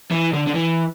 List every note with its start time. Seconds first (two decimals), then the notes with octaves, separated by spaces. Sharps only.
0.11 E3
0.33 D3
0.46 D3
0.54 E3